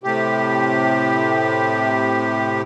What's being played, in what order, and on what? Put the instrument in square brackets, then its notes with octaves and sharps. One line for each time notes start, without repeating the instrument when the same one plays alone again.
[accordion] A2 C3 G4